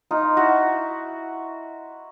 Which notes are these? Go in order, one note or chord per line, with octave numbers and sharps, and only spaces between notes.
D#4 F4
E4 F#4